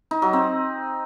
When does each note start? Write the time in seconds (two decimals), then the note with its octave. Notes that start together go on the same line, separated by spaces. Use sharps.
0.11 D#4
0.22 F#3
0.33 C4